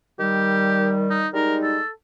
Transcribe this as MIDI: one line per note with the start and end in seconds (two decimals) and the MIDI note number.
0.19 1.27 51
0.19 1.27 55
0.19 0.92 67
1.10 1.28 63
1.34 1.79 55
1.34 1.79 56
1.34 1.79 63
1.34 1.57 70
1.62 1.89 69